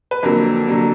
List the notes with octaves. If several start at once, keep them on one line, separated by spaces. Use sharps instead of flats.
B4
F2 D3 F#3 A#3 A#4
D3 F#3 A#3